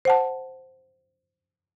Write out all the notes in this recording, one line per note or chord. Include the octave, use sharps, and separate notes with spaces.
C5 F#5 A5